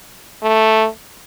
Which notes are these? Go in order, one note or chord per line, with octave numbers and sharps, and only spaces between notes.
A3